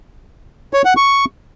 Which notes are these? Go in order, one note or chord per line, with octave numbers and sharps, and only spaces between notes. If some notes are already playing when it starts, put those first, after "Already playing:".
C#5
F#5
C#6